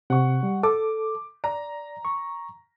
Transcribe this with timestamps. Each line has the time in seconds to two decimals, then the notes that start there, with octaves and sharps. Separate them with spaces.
0.10 C3 F#5 C#6
0.43 G3
0.63 A4 D6
1.44 D5 A#5
2.05 C#6